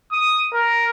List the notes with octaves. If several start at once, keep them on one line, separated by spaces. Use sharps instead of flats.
D#6
A#4